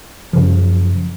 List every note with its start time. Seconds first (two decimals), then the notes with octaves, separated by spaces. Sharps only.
0.33 F#2 C#3 F3